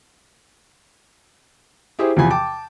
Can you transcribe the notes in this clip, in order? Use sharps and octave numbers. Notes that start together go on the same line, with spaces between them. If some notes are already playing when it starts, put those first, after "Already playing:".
E4 G4 G#4 C5
E2 C3 E3 F3 G#5 B5
G5 A5 D6